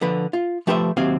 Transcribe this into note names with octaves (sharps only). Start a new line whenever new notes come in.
D3 F3 B4
F4
F3 A3 G4 B4 C5 E5
D#2 C3 F#3 C4 F5